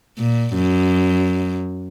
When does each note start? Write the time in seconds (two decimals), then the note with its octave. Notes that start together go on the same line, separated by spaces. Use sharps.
0.18 A#2
0.54 F#2